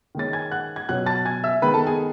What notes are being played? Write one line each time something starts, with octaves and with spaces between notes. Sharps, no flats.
D#3 G#3 C#4 A6
G#5 G#6
F#5 F#6
G#6
B2 F#3 C#4 F#5 F#6
A5 A6
G#5 G#6
E5 E6
D#3 G#3 B3 B4 B5
A4 A5
G#4 G#5